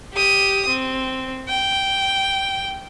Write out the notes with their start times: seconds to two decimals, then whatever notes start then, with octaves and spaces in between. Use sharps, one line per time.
0.13 G4 D#6
0.67 C4
1.48 G5